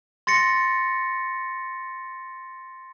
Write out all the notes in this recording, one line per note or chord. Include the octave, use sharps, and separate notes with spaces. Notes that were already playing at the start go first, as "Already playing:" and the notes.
C6 A6 A#6 C#7